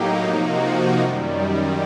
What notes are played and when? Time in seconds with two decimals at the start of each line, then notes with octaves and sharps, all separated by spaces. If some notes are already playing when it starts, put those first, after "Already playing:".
Already playing: A2 F#3 A#3 D#4 G4
0.25 C3 F3 A#3 D#4 F#4
0.98 F#2 D#3 G3